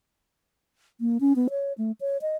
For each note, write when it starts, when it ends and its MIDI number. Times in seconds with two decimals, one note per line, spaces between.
1.00 1.18 58
1.21 1.35 61
1.36 1.48 59
1.50 1.73 73
1.78 1.92 57
2.01 2.18 73
2.22 2.36 75